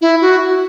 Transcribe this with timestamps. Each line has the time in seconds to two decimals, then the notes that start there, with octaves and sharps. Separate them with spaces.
0.01 E4
0.21 F#4